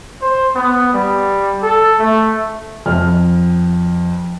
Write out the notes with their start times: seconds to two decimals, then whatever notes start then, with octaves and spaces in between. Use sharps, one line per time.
0.21 C5
0.55 B3
0.93 G3
1.62 A4
1.99 A3
2.86 F2 F6